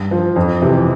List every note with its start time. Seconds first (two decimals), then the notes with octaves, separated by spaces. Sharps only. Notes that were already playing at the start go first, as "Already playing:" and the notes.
Already playing: G2
0.11 F3
0.36 F2
0.62 C3 E3